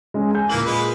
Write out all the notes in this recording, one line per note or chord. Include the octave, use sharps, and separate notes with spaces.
G#3 C#4
G#5 G6
A#2 E3 A#3 F#7
G#3 B4